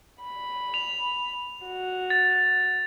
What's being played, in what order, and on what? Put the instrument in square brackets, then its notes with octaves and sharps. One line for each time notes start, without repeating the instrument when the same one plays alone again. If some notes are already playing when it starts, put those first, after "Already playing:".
[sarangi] B5
[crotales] F7
[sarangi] F#4
[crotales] A6